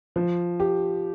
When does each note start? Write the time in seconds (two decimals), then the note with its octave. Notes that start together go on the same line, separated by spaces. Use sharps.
0.16 F3
0.60 G4